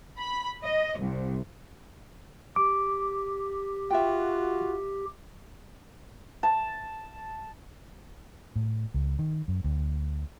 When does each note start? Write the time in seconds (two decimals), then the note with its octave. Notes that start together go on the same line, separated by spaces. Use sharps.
0.20 B5
0.63 D#5
1.00 C2
2.56 G4 D6
3.91 F4 F#4 E5 G5
6.43 A5
8.56 A2
8.94 C#2
9.19 D#3
9.48 F#2
9.64 D2